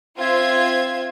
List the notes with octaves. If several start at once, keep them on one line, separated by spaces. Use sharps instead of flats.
C4 F4 C5 E5 G#6